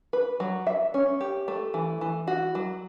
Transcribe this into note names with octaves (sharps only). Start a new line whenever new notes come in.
B4
F#3
E5
C#4
G4
A3
E3
E3
F#4
F#3